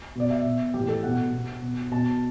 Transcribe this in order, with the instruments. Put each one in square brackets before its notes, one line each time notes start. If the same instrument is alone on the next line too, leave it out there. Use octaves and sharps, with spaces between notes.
[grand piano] B2 D5
E5
B2
A2 E3 G4
A4
B2 F#5
B2
B2
B2 A5